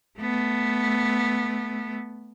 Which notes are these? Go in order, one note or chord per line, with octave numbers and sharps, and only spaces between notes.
A3 B3